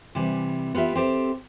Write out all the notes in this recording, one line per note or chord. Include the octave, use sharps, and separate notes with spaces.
C3 E3 G3
B3 F4 G4 E5
C4 G4 A4